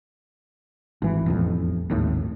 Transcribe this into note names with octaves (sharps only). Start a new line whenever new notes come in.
G#1 E3
E1 A1 F2
G#1 D#2 A2